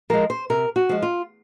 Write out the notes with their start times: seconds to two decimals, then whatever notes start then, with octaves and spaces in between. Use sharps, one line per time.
0.10 F3 G#3 A#4
0.30 C5
0.50 C3 A#4
0.76 F#4
0.89 F3 G#3
1.02 F4